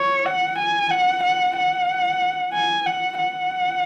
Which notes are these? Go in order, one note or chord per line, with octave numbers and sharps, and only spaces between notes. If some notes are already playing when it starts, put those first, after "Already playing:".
Already playing: C#5
F#5
G#5
F#5
F#5
F#5
G#5
F#5
F#5